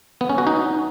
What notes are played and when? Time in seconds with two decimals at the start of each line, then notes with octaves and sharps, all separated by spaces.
0.21 B3
0.29 C#4
0.38 F#4
0.47 D#4